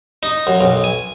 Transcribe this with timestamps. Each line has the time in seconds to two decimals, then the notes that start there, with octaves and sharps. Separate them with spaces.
0.23 D#4
0.47 F#2
0.61 B1
0.84 G#5